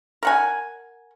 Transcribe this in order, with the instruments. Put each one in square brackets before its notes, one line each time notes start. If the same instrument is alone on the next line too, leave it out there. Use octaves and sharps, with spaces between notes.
[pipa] A#4 F#5 G#5